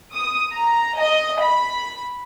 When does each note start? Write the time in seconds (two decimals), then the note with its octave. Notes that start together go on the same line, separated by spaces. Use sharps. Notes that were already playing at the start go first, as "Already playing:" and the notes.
0.12 D#6
0.52 A#5
0.98 D#5
1.39 B5